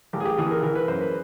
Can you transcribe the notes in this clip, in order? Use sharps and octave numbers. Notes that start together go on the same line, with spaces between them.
A1 G4
G#4
G4
E3 G#4
A#4
E3 A#4
B4
F#2 C5
B4